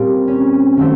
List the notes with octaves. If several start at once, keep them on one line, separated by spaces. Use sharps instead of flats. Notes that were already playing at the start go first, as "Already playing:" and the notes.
Already playing: A#2 G3 C4
C#4
D#3 F#3 A3 C4